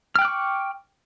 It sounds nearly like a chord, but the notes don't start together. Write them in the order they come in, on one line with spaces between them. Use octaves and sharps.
F6 G5 F#6 D6 C#6